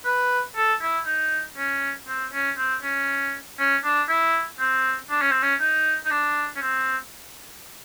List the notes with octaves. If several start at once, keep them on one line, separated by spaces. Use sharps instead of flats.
B4
A4
E4
D#4
C#4
C4
C#4
C4
C#4
C#4
D4
E4
C4
D4
C#4
C4
C#4
D#4
D#4
D4
C#4
C4